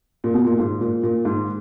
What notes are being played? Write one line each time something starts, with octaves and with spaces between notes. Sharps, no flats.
A#2
B2
A#2
G#2
A#2
A#2
G#2